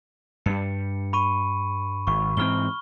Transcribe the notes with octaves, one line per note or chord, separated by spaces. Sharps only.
G2 G3 C#7
B5 C#6 D#7
G#1 C#6
G#2 E3 C4 F6 G7